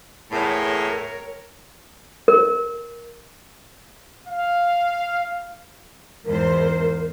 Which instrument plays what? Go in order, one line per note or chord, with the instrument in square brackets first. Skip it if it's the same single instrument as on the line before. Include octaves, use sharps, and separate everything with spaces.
[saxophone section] E2 A2 [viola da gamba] A#4 C#5
[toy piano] A#4
[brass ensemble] F5
[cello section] E2 G#2 C5 [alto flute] A#4